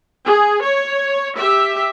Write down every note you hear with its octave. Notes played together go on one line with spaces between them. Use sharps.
G#4
C#5
G4 E5